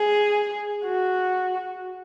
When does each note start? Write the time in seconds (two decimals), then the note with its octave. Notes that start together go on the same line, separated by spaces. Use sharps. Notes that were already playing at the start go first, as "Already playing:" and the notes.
Already playing: G#4
0.85 F#4